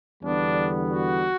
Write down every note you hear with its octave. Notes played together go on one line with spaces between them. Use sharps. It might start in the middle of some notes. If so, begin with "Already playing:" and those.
E2 D3 G3 B3 D4
F#4